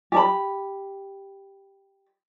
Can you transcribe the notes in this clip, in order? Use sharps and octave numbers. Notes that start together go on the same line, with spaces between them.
G4 A5 B5